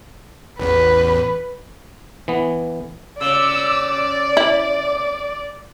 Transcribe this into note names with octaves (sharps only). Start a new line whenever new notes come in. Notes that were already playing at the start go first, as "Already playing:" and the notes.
A1 E2 B4
E3 B3
C#3 D5 D6 E6
E4 D6